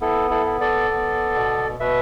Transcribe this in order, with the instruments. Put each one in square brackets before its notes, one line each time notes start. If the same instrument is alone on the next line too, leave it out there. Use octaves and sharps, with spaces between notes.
[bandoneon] B3 E4 A4
E4 A4
B3
A4 D5
B3
B2
B2 B4 E5